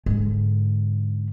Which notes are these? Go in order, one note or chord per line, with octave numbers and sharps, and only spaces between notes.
G#2 D3